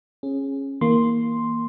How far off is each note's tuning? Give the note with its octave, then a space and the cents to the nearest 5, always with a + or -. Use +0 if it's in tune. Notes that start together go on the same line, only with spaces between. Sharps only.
C#4 -20 G#4 +0
E3 -45 A#3 +0 C6 +0